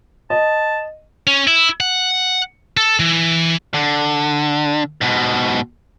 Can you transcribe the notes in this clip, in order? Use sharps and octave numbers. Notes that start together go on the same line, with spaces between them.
D#5 A5
C#4
E4
F#5
A4
E3
D3
G#2 B2